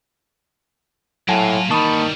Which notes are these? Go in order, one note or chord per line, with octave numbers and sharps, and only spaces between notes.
A2 F#3 A#3 F4 F#5 G#5 A5
D#3 E3 G3 A#3 A5 B5 C#6 D#6